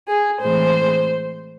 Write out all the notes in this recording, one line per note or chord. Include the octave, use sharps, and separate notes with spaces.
G#4
A2 E3 G#3 C4 C5